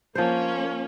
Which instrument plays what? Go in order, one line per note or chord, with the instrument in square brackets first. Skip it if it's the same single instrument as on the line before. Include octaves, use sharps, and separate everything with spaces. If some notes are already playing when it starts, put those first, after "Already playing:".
[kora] F3 C5 [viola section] A#3 C#4